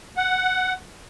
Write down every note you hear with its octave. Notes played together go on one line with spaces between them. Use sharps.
F#5